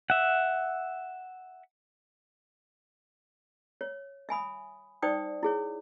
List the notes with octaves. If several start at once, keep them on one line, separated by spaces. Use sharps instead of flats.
E5 F#5
C#5
E5 G#5 B5 D#6
D#4 C5 D5 G5 D#6
E4 G#4 C#5